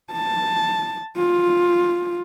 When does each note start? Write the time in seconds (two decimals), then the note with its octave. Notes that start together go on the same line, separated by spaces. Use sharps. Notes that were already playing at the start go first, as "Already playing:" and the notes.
0.12 A5
1.17 F4